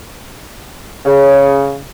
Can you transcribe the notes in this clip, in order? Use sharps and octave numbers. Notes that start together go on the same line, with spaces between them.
C#3